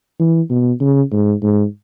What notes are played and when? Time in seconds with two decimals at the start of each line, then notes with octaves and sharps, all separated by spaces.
0.20 E3
0.50 B2
0.80 C#3
1.12 G#2
1.43 G#2